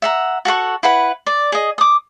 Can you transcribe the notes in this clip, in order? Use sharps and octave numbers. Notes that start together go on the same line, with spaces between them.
E5 F#5 A#5
F#4 A4 F#5 C#6
E4 B4 F#5 B5
D5
G#4 D#5
D6 D#6